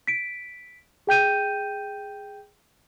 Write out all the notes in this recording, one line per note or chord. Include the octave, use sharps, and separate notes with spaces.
B6 D7
G#4 G5 G6 D#7